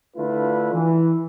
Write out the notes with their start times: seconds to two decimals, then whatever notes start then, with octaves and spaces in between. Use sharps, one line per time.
0.17 D3 A3 D4 E4 F4 B4
0.73 E3